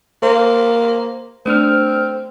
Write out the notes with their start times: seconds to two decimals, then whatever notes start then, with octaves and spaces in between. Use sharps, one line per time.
0.23 A#3 C5
1.46 A3 C4 D4 F6